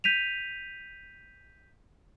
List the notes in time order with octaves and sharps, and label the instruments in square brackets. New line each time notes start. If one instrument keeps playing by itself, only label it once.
[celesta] G6 B6 D#7 F7